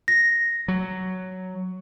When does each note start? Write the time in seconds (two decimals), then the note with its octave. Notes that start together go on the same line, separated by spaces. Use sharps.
0.08 A#6
0.68 F#3